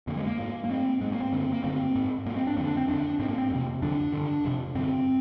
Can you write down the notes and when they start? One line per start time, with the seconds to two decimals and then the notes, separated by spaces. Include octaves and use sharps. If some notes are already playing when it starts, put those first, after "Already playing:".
0.07 F2 D3 A#3
0.17 G#3
0.27 A#3
0.38 G#2
0.64 A#3
0.70 G#2 C4
1.01 G#2 G#3
1.12 A#3
1.22 C4
1.32 G2 D3
1.52 A#3
1.63 G2 D3 C4
1.95 G#2
2.26 G#2 A#3
2.36 C4
2.47 D4
2.57 F2 C4
2.60 D3
2.67 D4
2.77 C4
2.88 F2 D3 D4
3.19 G#2 C4
3.28 A#3
3.38 C4
3.50 F2 C3
3.82 F2 D3 D4
4.12 G2 D3
4.45 F2 C3
4.75 G2 D3 C4